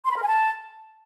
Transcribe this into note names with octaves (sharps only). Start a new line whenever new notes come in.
C6
B5
A#4
G#5
A5